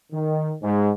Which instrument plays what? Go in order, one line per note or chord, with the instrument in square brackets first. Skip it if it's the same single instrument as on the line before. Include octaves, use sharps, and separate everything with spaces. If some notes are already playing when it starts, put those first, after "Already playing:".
[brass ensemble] D#3
G#2